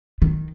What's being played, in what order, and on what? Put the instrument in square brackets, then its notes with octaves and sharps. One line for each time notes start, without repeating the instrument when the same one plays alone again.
[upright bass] D#3